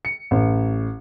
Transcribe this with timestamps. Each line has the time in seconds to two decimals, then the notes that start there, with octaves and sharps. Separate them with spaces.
0.05 C#7
0.31 A1